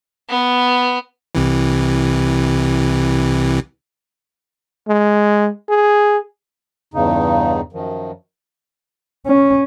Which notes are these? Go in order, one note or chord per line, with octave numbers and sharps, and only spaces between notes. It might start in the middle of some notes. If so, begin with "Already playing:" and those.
B3
C2 C3 E3
G#3
G#4
E2 G2 C#3 D#4
F#2 D#3 F3
C#4